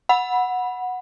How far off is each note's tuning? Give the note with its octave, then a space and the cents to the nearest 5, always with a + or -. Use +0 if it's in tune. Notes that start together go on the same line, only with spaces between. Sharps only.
F#5 -10 B5 -15